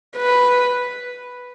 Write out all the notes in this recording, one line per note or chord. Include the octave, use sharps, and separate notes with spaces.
B4